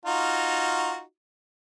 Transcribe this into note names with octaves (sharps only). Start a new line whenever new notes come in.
D#4 F4 F#4